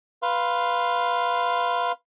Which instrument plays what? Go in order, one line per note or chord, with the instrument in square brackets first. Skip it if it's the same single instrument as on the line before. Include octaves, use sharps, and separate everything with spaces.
[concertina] B4 F5 C6